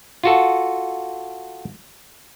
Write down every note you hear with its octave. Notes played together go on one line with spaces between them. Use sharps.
F4 F#4 A4